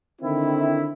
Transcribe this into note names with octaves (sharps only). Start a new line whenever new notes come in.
D3 D#3 C4 E4